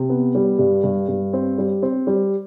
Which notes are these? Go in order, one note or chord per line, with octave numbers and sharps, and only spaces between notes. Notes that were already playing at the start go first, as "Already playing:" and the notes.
Already playing: C3
B3
G3
G2
G2
G2
C4
G3
C4
G3